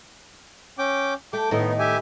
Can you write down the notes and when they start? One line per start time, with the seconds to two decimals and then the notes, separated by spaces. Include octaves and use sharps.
0.78 C#4 G5 D6
1.33 A3 G5 D6
1.51 A2 D#3 B3 D#4 E4
1.79 G4 E5 G#5